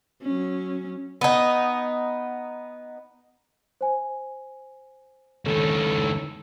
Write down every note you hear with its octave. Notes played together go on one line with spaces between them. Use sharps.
F#3 C#4
B3 D#4
C5 G#5
C#2 D#3 E3 C#4 A4